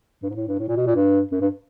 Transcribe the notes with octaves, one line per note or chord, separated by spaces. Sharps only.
G2
G#2
A2
G2
A2
A#2
B2
A#2
G2
F#2
G2